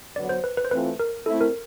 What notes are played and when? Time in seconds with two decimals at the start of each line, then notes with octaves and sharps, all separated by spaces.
0.15 D3 F#3 B3 D5
0.29 C5
0.44 B4
0.57 B4
0.65 C5
0.71 E3 A3 C4 F4 B4
0.99 A#4
1.26 A3 C4 E4 A4
1.41 A#4